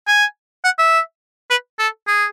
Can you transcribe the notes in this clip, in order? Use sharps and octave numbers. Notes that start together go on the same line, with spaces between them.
G#5
F#5
E5
B4
A4
G#4